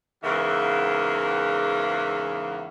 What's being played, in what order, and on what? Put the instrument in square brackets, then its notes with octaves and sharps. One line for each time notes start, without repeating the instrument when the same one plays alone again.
[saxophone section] E2 G#2 C#3 E3 A#3